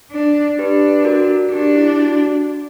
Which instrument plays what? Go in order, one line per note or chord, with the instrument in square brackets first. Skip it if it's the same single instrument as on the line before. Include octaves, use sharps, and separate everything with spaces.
[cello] D4
[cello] D4 [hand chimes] G4 B4
[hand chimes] F#4 A#4
[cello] D4 [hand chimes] G4
[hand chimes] E4
F#4